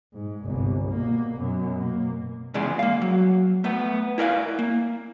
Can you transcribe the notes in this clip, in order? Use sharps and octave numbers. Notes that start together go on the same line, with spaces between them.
G#2
G1 C2
B2 A#3
F#2 B2
B2 A#3
E2 G#2 C#3 G#3 D5
A#3 F5
F#3
A3 B3
E4 A#4 D5 F5
A#3